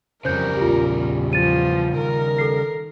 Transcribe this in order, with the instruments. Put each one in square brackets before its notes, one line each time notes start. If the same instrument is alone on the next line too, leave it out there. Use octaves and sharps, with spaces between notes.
[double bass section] F2 F#3 [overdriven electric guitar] C#3 G3 [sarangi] A#4 [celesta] C5 G6
[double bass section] A#1 E2 [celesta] F4 G4
[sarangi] F3 [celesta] F4 A6 D#7
[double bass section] D#3 [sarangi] A#4
[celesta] A4 C7